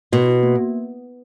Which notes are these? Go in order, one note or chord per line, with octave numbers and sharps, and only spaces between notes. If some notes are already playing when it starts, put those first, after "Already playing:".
B2 F#4
F#4
A#3